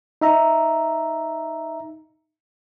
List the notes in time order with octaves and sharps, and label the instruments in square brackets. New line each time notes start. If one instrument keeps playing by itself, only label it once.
[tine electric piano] D#4 E5 A#5